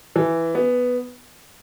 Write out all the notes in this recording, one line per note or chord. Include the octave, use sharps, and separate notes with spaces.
E3
B3